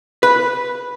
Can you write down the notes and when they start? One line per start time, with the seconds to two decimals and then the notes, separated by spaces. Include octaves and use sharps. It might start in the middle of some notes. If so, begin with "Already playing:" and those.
0.23 B4